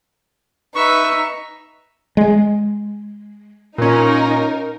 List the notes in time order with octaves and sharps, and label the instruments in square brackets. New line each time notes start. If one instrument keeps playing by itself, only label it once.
[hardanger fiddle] D#4 [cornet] B4 [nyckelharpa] E5 [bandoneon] C#6
[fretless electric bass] G#3
[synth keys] A#2 C#4 [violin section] D#4 A#4